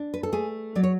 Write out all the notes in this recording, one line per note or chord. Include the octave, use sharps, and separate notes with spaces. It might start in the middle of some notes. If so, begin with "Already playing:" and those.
Already playing: D4
B4
A4
A3 G#4
F#3 D5
C#5